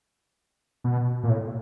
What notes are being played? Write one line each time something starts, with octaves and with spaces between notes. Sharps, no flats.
B2
A#2
A2